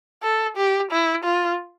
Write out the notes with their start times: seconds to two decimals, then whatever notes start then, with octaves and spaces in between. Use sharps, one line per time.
0.23 A4
0.57 G4
0.91 E4
1.24 F4